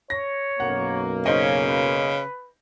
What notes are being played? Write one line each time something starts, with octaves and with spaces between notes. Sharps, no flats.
C#5 A#6
B1 F#2 A#3 F#5
C#3 C#4 D#4 C5 D#5
B4